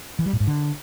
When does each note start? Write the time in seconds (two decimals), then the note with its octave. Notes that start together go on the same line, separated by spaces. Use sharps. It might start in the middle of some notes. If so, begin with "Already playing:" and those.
0.19 E3
0.26 G3
0.33 A2
0.40 G#2
0.47 D3